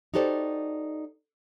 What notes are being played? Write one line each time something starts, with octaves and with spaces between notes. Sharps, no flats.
D#4 F#4 G4 A4 C5 D5